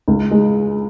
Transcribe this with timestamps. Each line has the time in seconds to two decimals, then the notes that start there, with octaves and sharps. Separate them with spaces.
0.08 C#2
0.31 G#3